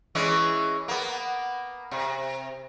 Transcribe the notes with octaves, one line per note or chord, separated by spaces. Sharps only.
E3 G#3 C#4
A#3 B3
C3